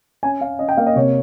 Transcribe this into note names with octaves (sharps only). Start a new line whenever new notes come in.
C#4 G#5
C#4 F5
C#4 D#5
G5
A#3 F5
D#5
C3 C#5